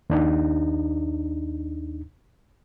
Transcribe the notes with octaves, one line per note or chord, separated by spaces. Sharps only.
D#2 D4 D#4